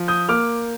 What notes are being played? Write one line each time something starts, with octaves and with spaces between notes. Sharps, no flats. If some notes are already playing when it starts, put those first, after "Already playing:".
Already playing: F3
D#6 G6
A#3 D6 F6